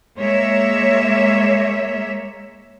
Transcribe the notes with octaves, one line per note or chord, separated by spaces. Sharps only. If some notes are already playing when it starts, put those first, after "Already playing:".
G#3 A#3 C#5 E5